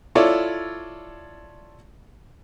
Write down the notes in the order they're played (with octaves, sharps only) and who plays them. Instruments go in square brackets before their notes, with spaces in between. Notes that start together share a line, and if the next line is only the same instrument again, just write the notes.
[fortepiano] E4 F4 A4 C#5 D5